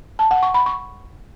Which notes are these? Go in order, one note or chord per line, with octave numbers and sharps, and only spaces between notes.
A5
F#5
C#6
B5
C#6